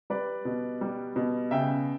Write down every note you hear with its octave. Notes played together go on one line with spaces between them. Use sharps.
G3 B4 D5
B2
G3
B2
C#3 E5 G5